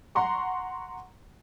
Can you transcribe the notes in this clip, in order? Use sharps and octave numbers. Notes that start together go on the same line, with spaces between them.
F#5 A#5 C6 C#6